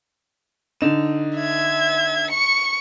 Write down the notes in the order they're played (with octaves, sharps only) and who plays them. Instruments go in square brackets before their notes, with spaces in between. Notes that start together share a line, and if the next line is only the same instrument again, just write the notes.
[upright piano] D3 D#4 E7
[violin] E5 G#6
C#6 C#7